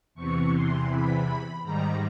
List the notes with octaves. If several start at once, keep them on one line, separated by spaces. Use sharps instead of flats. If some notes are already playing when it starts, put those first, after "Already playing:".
E2 C3 E3 C#6
C6
B5
G#2 D#3 G3 A#5